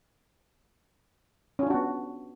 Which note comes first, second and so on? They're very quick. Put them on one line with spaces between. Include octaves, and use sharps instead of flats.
C#4 F4 D4 F#4 B3